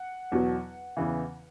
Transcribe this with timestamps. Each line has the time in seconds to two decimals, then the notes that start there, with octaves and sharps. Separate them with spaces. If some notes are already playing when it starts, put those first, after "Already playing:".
Already playing: F#5
0.32 E2 B2 F#3
0.97 E2 C#3 E3